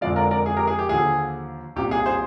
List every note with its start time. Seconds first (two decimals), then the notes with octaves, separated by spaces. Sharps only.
0.01 F2 D3 F3 G#3 D5 F5
0.16 A#4 D5
0.31 A#4 D5
0.46 G#4
0.57 G4 A#4
0.67 G#4
0.79 G4
0.89 D#2 D3 F3 G#4
1.76 C2 A#2 F3 G4
1.91 G#4
2.06 G#4 C5